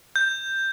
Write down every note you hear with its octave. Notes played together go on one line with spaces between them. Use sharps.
G6